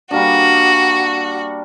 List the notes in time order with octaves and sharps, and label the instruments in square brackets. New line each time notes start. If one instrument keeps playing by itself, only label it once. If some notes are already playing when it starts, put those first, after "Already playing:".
[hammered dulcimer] G3 A#3 D4 [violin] F#4